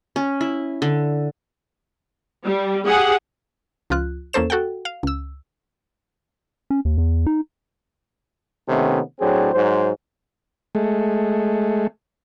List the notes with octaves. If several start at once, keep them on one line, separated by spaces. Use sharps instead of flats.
C#4
E4
D3
G3
G4 G#4 F#5
C#2 F3 F4 F#6
E2 A#3 C#4 A4 C5 E7
F#4 A4 F#5 G5
F5
C#2 E6
C#4
D#2
E2
D#4
C3 D#3 A3 B3 C#4
A2 F#3 C4 D4 G#4
G#2 F#3 C5
G#3 A3